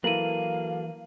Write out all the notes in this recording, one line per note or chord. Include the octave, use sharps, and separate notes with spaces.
E3 F#3 A#3 A4 A#4 F5 D#7 F#7